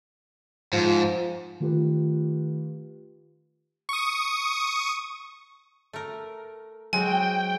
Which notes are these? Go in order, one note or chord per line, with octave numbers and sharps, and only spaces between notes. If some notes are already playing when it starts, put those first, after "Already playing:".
G#2 F3
D#3 A3 F4 G4 B4
C#6 D#6
A3 A#4
F#3 G#3 C4 F#4 G5 G#5